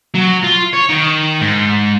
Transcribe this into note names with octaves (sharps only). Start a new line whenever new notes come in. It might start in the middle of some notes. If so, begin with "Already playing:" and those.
F#3
F4
C#5
D#3
G#2